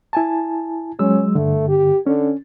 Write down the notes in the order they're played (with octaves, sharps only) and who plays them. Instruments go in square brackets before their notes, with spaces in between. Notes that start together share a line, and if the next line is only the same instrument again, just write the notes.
[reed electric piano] E4 G#5 A5
[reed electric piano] F#3 G#3 E6 [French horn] C#4
[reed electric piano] G2 D3 [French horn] A3
[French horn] G4
[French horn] D3 [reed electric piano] C#4